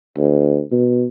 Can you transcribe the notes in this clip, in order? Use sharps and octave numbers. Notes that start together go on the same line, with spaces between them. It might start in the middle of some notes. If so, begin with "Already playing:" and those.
D2
B2